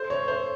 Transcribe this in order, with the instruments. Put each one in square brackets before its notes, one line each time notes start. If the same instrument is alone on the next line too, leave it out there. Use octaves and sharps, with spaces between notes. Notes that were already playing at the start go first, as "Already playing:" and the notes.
Already playing: [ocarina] A4 [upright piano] C5
[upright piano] C#5
C5